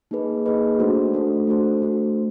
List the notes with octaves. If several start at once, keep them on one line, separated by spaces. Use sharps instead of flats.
A#3 D#4 G#4 B4 D#5
A#3 D#4 G#4 B4 D#5
A3 D4 F#4 A4 C5
A3 D4 F#4 A4 C5
A3 D4 F#4 A4 C5
A3 D4 F#4 A4 C5